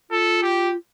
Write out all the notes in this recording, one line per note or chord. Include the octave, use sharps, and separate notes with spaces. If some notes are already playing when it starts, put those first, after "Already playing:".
F4 A4
G4